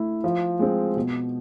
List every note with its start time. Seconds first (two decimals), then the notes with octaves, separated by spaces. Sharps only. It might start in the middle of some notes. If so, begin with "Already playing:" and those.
Already playing: A3 E4
0.24 F3
0.59 G#3 C4
0.97 B2